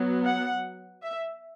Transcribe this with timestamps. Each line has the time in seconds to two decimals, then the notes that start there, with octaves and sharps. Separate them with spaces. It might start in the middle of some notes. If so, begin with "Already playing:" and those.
Already playing: F#3 B3
0.24 F#5
1.03 E5